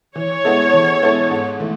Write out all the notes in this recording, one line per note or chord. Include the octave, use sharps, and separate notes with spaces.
E3 C#5
G#3 B3 E4 A4
E3
G#3 B3 E4 A4
G#2
E3 A3